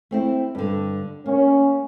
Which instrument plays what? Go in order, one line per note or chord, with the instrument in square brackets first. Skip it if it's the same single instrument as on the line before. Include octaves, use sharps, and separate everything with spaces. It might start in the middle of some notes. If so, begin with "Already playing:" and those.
[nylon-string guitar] A3 C4 E4
G2 D3
[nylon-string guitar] A#3 [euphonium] C#4